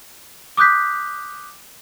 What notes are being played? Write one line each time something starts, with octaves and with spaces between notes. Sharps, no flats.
D6 D#6 F#6 G6 B6